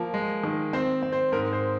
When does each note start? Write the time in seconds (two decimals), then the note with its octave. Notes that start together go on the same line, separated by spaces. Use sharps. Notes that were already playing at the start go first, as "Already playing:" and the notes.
Already playing: F3 A#3
0.14 G#3
0.44 D#3
0.73 C4 C5
1.03 C4
1.12 C5
1.32 G#2 A#4
1.53 C5